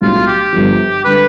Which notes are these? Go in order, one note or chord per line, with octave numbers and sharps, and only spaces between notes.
B1 A2 G3 D4 F4
G4
G1 G2 F3
D3 G3 B4